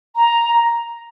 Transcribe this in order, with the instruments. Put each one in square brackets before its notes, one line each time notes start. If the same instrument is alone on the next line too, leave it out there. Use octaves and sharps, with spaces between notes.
[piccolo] A#5